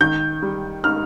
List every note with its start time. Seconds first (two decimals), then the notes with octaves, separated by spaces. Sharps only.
0.01 D#3 G6
0.42 G3
0.84 D#4 F6